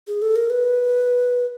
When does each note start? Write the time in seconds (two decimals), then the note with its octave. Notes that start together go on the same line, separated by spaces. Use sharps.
0.08 G#4
0.22 A4
0.36 A#4
0.50 B4